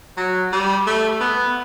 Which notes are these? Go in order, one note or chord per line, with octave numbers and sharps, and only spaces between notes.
F#3
G3
A3
B3